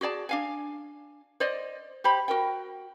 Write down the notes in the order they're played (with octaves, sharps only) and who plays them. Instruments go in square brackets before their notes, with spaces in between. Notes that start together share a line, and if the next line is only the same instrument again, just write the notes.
[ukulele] F#4 G#4 D5 A5
D4 F5 G#5
C5 D5 D#5
G4 C5 B5
F#4 A#4 G5